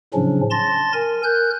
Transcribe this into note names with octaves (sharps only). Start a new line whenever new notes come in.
A2 C#3 F3 F#3 C#4 D4
A5 C6 A6 A#6
A#4 G#5
A#4 F#6 G6